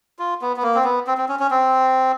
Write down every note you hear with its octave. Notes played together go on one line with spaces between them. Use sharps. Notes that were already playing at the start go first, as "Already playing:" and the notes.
F4
B3
B3
A#3
C4
B3
C4
C4
C#4
C#4
C4